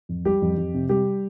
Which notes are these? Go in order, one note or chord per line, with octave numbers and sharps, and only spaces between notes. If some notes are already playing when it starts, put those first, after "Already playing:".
F2
G3 G4
F2
F2
C3
G3 G4